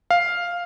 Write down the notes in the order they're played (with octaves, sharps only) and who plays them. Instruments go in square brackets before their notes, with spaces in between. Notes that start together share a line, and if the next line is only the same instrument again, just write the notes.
[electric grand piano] F5